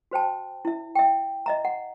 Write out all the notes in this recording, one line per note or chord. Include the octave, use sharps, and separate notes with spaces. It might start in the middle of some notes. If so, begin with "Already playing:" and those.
F#4 C5 G5 A5
E4 E5
E5 G5
D#5 E5 A#5
F#5